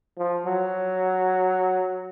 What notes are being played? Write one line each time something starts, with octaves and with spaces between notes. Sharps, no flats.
F3
F#3